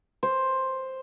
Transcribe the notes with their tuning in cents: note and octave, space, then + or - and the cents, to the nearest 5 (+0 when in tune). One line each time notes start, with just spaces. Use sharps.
C5 +5